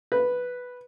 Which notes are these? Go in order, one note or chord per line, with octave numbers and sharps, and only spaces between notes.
B4